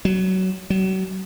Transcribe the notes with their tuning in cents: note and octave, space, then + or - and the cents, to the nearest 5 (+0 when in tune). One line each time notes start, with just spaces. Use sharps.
F#3 +20
F#3 +35